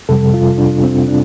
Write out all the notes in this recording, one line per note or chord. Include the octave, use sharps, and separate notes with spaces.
F2 C3 G3 A4
F4
D4
C4
D4